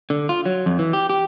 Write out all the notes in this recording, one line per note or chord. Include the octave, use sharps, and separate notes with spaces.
D3
F4
F#3
F2
E3
G4
G4